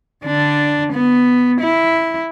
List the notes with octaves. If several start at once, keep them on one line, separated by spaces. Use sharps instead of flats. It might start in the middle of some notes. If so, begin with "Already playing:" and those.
D3 D4
B3
E4